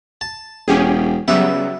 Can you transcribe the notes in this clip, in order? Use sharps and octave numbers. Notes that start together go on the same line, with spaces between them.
A5
E1 C#4 G4 G#4
C#3 F#3 G3 B3 E5